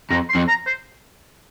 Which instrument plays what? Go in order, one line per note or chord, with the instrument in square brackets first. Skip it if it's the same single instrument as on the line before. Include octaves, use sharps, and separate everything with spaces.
[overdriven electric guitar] F2 [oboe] A#5
[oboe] C6
[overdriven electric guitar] F2
[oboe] A#5
C5